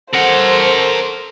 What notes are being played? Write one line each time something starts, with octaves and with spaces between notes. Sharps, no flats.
A4 A#4 C5 F#5